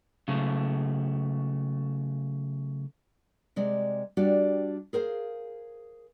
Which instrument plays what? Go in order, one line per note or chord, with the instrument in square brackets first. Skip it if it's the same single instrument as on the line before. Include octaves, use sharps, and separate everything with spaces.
[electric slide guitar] C#3 F#3 A3
[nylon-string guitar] C3 G#3 D5
G3 D4 F#4 G4 D5
G#4 A#4 C5 F5